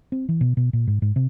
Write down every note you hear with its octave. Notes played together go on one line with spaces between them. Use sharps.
C4
E3
B2
B2
A#2
G#2
G#2
C3